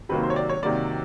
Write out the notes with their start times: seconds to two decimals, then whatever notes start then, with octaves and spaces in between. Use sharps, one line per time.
0.09 C3 D#3 F#3 A#3 B4
0.23 C5
0.30 C#5
0.36 D5
0.49 C#5
0.62 C3 D#3 F#3 A#3 D5